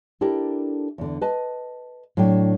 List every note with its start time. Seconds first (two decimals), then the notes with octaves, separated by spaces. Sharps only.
0.21 D4 E4 G4 A4 A#4
0.98 E2 D3
1.21 B4 D#5 A5
2.17 A2 F#3 D4 G5